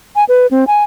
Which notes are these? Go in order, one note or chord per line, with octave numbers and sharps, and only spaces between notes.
G#5
B4
C4
G#5